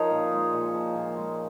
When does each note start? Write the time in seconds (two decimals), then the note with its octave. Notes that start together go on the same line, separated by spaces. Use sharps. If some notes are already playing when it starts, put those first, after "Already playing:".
Already playing: F3 D#4 A#4 C#5
0.11 A#2
0.32 G#3
0.53 A#2
0.74 F3
0.95 A#2
1.17 G#3